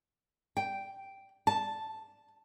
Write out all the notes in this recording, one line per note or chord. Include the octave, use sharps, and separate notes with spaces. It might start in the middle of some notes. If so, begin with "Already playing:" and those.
G5
A5